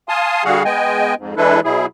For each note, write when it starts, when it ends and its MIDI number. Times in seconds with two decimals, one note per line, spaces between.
0.09 0.44 77
0.09 0.44 80
0.09 0.44 81
0.09 0.44 84
0.09 0.44 87
0.45 0.63 50
0.45 0.63 55
0.45 0.63 66
0.45 0.63 68
0.45 0.63 77
0.45 0.63 78
0.65 1.14 56
0.65 1.14 59
0.65 1.14 75
0.65 1.14 79
0.65 1.14 80
1.18 1.35 41
1.18 1.35 44
1.37 1.60 52
1.37 1.60 56
1.37 1.60 62
1.37 1.60 64
1.37 1.60 69
1.37 1.60 71
1.64 1.86 47
1.64 1.86 54
1.64 1.86 64
1.64 1.86 68